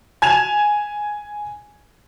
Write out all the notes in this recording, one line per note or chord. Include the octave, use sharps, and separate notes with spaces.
G#5 G#6 E7 F7